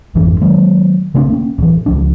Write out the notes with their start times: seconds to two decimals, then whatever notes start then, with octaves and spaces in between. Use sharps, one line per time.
0.15 G#1 F2 E3 D4
0.41 D#3 F#3 G#3 A#3
1.15 C#3 A3 C4 D4
1.29 A#3 C#4
1.58 D1 E3
1.86 C#2 F3 D4